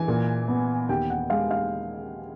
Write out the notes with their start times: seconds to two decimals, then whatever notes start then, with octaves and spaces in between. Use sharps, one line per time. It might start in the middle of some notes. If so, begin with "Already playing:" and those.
Already playing: E3 G#5
0.08 A#2
0.48 B3
0.89 D#2 G5
1.10 F#5
1.30 G#3 F5
1.51 F5